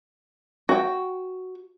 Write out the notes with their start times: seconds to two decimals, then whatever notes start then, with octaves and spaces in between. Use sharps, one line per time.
0.69 F#4 G5